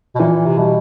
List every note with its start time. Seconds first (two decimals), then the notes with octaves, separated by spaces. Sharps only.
0.15 B2
0.20 A#2 E3
0.46 C3
0.58 B2 G3